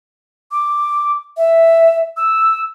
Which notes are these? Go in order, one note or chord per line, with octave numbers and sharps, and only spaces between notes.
D6
E5
E6